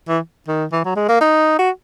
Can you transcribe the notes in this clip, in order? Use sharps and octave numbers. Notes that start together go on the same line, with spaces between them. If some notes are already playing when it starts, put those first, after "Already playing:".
E3
D#3
E3
F#3
G#3
A#3
D#4
F#4